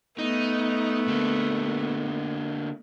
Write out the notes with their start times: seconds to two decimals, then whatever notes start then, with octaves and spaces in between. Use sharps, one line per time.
0.19 A3 B3 D#4
1.08 D3 A#3